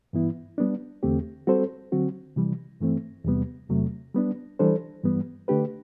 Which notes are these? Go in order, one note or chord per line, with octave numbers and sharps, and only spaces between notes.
G2 E3 B3 E4
G3 B3 D4
E2 D3 A3 C4 G4
G3 C4 F#4 A4 C5
D3 F#3 C4 F#4
C3 E3 G3
G2 E3 A3 C4
E2 C3 G3 B3
E2 C3 F#3 A3
G3 B3 D4
E3 G3 D4 A4 C5
G2 E3 G3 B3
D3 A3 D4 G4 B4